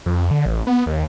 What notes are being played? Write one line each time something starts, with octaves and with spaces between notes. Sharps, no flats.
F2
D3
A1
B3
D#2